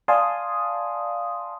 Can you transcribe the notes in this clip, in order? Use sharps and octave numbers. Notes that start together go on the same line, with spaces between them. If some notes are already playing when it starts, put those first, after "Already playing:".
D5 F5 G#5 A5 C6 D#6